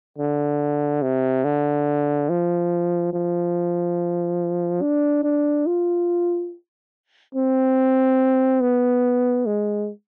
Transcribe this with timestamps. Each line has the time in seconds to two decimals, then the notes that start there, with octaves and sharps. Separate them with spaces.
0.18 D3
1.02 C3
1.44 D3
2.29 F3
3.13 F3
4.81 D4
5.23 D4
5.66 F4
7.35 C4
8.61 B3
9.46 G#3